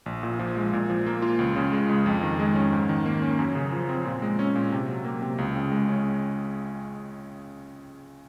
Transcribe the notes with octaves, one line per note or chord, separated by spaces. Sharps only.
A#1
A#2
F3
G#3
A#2
F3
A#3
F4
C#2
C#3
G#3
C#2
F2
D#3
G#3
C#4
G#2
D#3
A#3
C#4
F#2
C#3
F3
C4
A#2
G#3
C#4
A#2
C3
F#3
A#3
C3
C#2
C#3
G#3
C#4